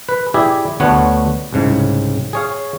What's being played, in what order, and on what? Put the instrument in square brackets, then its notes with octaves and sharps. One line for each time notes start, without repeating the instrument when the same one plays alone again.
[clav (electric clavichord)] B4
E4 G4 G#4 D5 E5
D2 D3 A3 B3 C#5 F#5
C2 G#2 C#3
G#4 C#5 F5